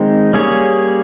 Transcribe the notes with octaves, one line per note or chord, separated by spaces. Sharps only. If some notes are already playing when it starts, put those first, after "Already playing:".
Already playing: D#3 G#3 C4 D#4
G3 A#3 C#4 G#4 C#5